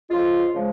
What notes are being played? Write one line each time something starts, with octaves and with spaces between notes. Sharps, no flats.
F2 C#3 F3 G#3 F4
C#3 F3 G#3